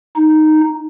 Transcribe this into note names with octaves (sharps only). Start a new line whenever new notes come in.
D#4